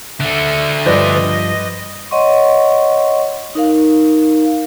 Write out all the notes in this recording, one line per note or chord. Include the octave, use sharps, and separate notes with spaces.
D3 A3 E5
G2 F3 B4 C5 D5 D#5
C#5 D#5 F#5 C6 C#6
D#4 A#4 F5